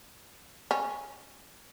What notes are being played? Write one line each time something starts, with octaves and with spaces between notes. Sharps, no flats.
C#4